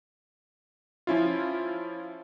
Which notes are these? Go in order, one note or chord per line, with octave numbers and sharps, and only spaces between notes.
F3 C#4 E4 F4